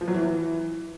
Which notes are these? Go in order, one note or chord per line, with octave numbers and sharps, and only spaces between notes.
F3
F#3
E3